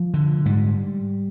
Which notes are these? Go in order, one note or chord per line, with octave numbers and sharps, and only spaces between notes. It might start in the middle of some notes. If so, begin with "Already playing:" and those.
Already playing: F3
D3
G#2 G3